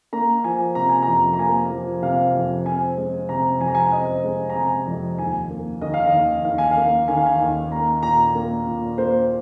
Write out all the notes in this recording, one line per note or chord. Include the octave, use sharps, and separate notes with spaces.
A#3 A#5
F3 G#5
C3 A#5
G#5
F2 A#5
A#5
A#3 G#5
F3
C3 F5
F2
C4 G#5
G#3
C3 A#5
F2 G#5
A#5
G#5
C4 D#5
G#3
A#5
C3 G#5
F2
D#2 G#5
A#3
D#3 D#5
F5
D#5
D#2
D#2 F5
G#5
F5
A#3
D#3 G#5
F5
G#5
D#2
A#3 A#5
A#2 A#5
A#3
A#2
A#3 C5